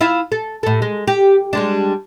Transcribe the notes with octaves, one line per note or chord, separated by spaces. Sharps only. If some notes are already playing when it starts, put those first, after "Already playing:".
E4 F4 F5
A4
A2 A4
G#3
G4
G3 G#3 D4